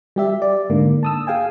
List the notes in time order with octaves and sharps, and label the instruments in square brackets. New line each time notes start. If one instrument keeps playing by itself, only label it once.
[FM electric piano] G3 G4 E5
D5
G#2 D3 A#3
A5 D#6 E6
G#4 F5 G5 G#5